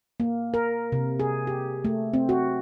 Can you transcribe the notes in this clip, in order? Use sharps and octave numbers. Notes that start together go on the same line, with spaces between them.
A#3
A#4
C3
G#4
G4
A3
C4
F#4